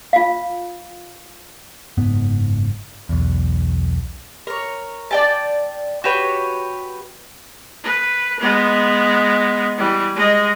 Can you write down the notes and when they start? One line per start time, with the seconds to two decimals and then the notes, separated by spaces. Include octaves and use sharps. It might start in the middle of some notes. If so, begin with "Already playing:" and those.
0.13 F4 F5
1.97 F#1 G#2 B3
3.09 B1 E2
4.47 A#4 C#5
5.11 D5 G5 A5
6.04 F#4 G4 B4 C#5
7.83 B4
8.40 G#3 B3
9.77 E3 G3
10.15 G#3 D#5